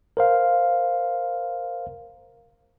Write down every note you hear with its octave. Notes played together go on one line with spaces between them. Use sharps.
A#4 C5 F5